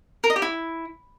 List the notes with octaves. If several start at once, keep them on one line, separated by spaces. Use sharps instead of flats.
A#4
D#5
G4
E4